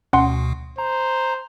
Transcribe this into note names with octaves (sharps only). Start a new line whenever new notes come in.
D2 B2 C#4 F#5 C6
C5 A#5